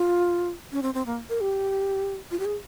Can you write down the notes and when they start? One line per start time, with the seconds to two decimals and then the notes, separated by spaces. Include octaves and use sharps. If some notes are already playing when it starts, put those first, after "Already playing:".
Already playing: F4
0.72 C#4
0.82 C4
0.94 C4
1.06 A#3
1.30 A#4
1.41 G4
2.31 F4
2.39 G4
2.45 G#4